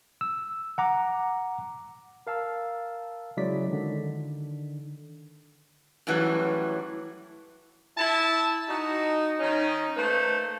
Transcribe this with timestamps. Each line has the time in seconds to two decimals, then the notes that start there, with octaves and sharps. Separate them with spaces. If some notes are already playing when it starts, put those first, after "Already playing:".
0.21 E6
0.78 F#5 A#5 D6
2.27 A#4 F5 A5 E6
3.37 C#3 F#3 G#3 E4 D5 B6
3.70 D3 D#3
6.07 F#2 A2 E3 F#3 G3
7.97 E4 A5
8.68 D#4 F#4
9.40 D#3 C#4 D#4
9.97 A3 A#3 B4 C5 A5